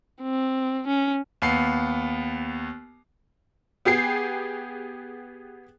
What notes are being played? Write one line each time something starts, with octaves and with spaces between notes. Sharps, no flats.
C4
C#4
D#2 B3 C7
B3 G4 G#4 C7